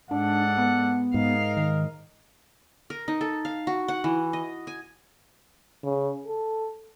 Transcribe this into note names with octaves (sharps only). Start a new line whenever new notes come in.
G#2 D4 A4 D5 F#5
B3
G#2 A#4 D#5 F5
D#3
A#4
D#4
A4
F5
F#4
F#5
E3
D#5
G#5
C#3
A4